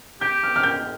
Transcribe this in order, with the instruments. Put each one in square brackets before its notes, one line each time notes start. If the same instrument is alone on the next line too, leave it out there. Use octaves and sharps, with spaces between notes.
[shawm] G4 [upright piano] G6
[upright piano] F6
F6
G6